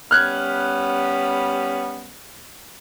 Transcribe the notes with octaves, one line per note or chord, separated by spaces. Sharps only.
G3 B3 C#4 F6 F#6 G#6